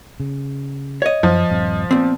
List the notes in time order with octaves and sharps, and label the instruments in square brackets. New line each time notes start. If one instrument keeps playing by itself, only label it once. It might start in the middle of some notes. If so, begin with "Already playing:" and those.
[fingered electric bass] C#3
[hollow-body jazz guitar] C#5 D#5
[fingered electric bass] F#2 [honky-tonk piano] F3
[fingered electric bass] D#1 G2 C4
[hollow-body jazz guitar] A#2 C4 [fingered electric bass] B3